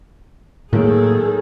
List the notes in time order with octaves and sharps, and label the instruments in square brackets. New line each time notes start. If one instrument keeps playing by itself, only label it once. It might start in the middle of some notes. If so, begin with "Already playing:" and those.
[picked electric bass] A2 A#3 [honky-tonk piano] D#3 F#3 [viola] G#4 A4